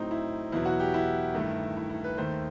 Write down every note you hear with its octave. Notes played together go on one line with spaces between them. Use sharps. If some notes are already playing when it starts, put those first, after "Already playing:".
Already playing: A2 F#3 A3 C4 D#4
E4
E2 B2 F#3 E4
F#4
G4
E4
G2 D#3 A3
E4
E4
B4
D#2 D#3 A3 C5